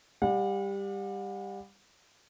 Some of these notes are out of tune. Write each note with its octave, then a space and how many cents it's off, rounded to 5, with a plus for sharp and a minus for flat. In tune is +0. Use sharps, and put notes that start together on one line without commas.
G3 +15 F#5 -40